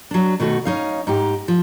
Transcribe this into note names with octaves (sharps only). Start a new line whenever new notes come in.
F#3 D4
B2 D#3 A3 F#4
C#4 D#4 F5
G#2 D#4 G4
F3